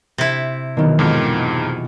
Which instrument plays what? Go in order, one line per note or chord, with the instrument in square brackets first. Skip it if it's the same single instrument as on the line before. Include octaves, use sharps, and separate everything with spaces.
[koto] C3 E4
[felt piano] B2 E3 F#3 [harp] D#3 A#3
[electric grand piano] F2 G#2 [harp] F4 G4